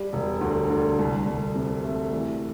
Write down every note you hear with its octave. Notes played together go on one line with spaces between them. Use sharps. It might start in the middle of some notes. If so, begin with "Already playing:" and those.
Already playing: G3
E1
D2
D3
C2
C2
C3
A3
E3